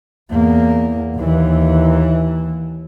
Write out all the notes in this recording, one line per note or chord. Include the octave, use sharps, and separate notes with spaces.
E2 A#3
D#2 E3